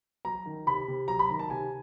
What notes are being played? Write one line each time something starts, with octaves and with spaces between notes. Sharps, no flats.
F#3 A#5
D#3
C3 B5
C3
F#3 A#5
B5
D#3 A#5
A5
C3 G#5